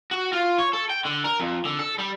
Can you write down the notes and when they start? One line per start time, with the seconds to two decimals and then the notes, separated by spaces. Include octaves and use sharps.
0.11 F#4
0.33 F4
0.58 C#5
0.73 A4
0.90 G5
1.05 D3
1.24 A#4
1.40 F2
1.65 D3
1.79 A4
1.98 G3